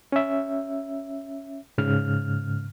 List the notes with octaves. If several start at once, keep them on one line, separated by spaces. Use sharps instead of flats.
C#4 E5
G#2 C#3 F6